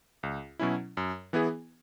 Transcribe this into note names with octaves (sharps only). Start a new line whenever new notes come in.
C#2
B2 F#3 C#4 E4
F#2
E3 B3 E4 G#4